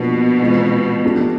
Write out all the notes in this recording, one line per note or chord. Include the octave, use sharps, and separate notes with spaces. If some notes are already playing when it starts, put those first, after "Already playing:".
Already playing: B2 F3 A#3 D4
E3 G#3 C4 F4
F3 A3 D4 G4